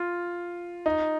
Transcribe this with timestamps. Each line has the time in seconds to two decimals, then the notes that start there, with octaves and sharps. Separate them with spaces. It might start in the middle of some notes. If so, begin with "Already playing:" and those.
Already playing: F4
0.86 D#4